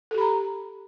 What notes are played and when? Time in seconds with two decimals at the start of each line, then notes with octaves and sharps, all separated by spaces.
0.11 A4
0.14 G4
0.18 B5
0.21 A#5